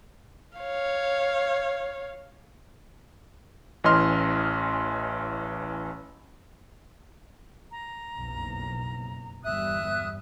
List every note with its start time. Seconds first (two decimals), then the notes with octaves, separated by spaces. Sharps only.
0.57 C#5 F5
3.84 A1 E3 C#4 D#5 C6 F6
7.72 A#5
8.16 F#1 B1 F2
9.44 G1 E2 G3 E5 D#6 F#6